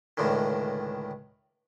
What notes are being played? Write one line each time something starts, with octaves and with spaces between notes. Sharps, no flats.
C#2 A2 D3 D#3